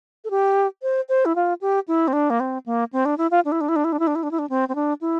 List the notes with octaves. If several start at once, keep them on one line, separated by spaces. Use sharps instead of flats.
A4
G4
C5
C5
E4
F4
G4
E4
C4
D4
A#3
C4
A#3
C4
D4
E4
F4
D4
E4
D4
E4
D4
E4
D4
E4
D4
E4
D4
E4
D4
C4
C4
D4
E4